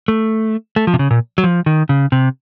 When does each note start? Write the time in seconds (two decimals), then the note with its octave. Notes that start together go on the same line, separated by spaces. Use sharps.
0.08 A3
0.76 A3
0.87 F3
0.94 C3
0.99 C#3
1.10 A#2
1.38 F#3
1.44 F3
1.66 D#3
1.89 C#3
2.12 C3